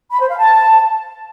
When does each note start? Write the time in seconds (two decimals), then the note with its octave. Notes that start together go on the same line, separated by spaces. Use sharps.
0.11 B5
0.20 C5
0.29 F5
0.39 A5